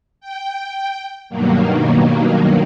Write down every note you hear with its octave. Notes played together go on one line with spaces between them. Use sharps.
G5
G2 B2 D#3 F#3 A#3